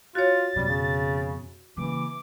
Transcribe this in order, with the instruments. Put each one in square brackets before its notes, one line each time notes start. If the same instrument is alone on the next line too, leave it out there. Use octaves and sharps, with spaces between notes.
[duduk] F4 [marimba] F#4 C#5 [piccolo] A6
[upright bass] F2 B2 [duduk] G3
[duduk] C#3
[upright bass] C#3 A#3 [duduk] E3 [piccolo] D6